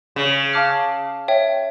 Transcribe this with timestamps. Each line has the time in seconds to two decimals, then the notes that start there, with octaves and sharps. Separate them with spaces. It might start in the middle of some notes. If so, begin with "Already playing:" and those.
0.16 C#3
0.53 F5 A5 D6 F6
1.28 C#5 E5 G5